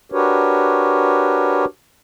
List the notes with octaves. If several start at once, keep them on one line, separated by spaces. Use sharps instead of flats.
D4 F#4 G4 A#4 B4 C#5